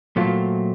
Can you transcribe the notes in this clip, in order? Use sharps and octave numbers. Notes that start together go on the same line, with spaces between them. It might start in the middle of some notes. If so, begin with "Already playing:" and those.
A#2 F#3 A3 C4 F4